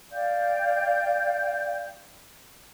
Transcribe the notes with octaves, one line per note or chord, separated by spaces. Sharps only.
D5 F5 G5 G6